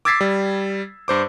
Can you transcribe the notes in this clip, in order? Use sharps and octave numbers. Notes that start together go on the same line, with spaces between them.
D6 E6 G#6 A6 B6 C7
G3
G2 C5 D6